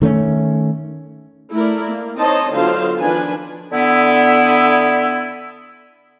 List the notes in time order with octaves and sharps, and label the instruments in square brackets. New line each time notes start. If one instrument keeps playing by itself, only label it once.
[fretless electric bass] D#3 A3 A#3 C#4
[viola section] A3 E4 A#4 D5
A#3
C4 D#4 C5 C#5 D#5 A5
D3 F#3 B3 F4 C5 F5
D#3 F3 D4 B4 G#5
[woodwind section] D3 B3 E4